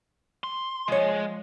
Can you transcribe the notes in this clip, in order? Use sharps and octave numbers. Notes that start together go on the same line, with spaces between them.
C6
F3 G#3 C#5